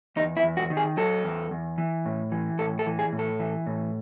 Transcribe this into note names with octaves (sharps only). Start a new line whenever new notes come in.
E2 D#4
E4
E2
F#4
D#3
G#4
F#3 A4
E2
E2
E3
A2
E3
A2 A4
A4
E3
G#4
A2
A4
E3
A2